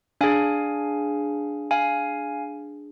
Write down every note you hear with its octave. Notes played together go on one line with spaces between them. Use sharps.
D4 G#4 F5 G#5
F5 G#5